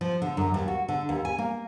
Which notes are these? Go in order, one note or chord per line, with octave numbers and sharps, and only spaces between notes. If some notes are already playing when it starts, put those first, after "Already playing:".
F3
D3
F#2
D#2
F#4
D3
D#2
G#5
A#3